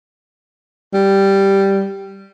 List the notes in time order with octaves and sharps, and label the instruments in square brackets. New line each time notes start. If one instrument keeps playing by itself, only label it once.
[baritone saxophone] G3